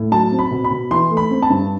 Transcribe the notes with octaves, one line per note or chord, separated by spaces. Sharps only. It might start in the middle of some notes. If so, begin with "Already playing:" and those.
Already playing: A2
F#3 A5
C4
B5
B2
B5
B2
E3 C6
A3
B5
C4
A5
G2